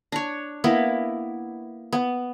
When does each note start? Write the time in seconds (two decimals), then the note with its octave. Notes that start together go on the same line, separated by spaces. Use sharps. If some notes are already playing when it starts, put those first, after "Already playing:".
0.12 D4 C#5
0.64 A#3 B3 E4
1.93 B3